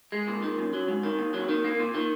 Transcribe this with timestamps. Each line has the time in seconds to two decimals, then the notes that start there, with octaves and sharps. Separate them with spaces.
0.12 G#3
0.28 A#2
0.43 D#3
0.58 F#2
0.73 F#3
0.88 G#2
1.03 D#3
1.19 D#2
1.34 F#3
1.49 D#3
1.64 A#3
1.80 A#2
1.94 D#3